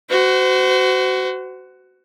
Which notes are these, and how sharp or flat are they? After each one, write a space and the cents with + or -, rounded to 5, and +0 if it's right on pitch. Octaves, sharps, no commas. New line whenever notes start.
F#4 +15 C5 -35